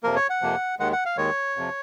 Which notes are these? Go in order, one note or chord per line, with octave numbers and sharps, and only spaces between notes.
F2 C3 F3 A#3 A#4
C#5
F#5
F2 C3 F3 A#3
D#2 D#3 G#3 F#5
F#5
F5
D#2 D#3 G#3 C#5
F2 C3 F3